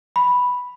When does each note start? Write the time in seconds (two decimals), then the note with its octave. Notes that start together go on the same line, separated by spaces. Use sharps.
0.16 B5